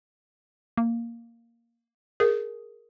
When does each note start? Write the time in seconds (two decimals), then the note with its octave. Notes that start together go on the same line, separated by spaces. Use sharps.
0.77 A#3
2.20 G#4 A#4